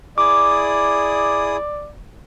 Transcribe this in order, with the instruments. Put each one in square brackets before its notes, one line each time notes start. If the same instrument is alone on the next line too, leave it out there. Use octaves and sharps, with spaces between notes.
[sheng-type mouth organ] E4 G#4 D#6 [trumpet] D5 [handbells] D6